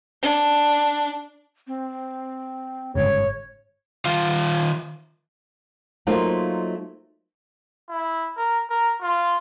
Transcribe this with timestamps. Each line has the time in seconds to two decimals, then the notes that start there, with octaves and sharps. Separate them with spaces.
0.22 D4
1.68 C4
2.95 G1 G#2 C#3 C#5
4.05 D#3 F4 F5
6.07 F#3 A3 A#3 D#4 F4 C5
7.89 E4
8.37 A#4
8.71 A#4
9.02 F4